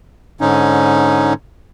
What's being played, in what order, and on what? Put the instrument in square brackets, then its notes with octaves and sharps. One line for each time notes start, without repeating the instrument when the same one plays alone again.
[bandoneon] G#2 D3 C#4 D#4